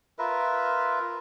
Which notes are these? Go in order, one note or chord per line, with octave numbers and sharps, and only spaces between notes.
F4 A#4 B4 E5